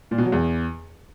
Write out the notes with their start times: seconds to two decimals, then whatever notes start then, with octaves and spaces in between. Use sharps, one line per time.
0.11 A#2
0.18 B2
0.25 F#3
0.32 E2